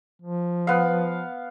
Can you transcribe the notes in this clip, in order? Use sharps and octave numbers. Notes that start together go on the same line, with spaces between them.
F3
B3 F5